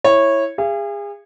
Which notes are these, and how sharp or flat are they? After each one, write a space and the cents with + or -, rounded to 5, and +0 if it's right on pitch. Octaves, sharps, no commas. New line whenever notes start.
E4 +0 C#5 -15
G#4 -35 F5 -45